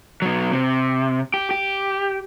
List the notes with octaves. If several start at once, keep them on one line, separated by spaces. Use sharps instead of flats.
B2 F#3
C3
G4
G4